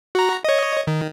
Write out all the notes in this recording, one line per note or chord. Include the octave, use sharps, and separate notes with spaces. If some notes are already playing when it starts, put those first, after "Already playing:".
F#4 A#5
C#5 D#5
D#3